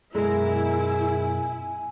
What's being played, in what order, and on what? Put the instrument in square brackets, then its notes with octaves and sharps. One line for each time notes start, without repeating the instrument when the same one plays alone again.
[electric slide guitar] F#2 B2 A#4 [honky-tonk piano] G#3 [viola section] E4 [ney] G#5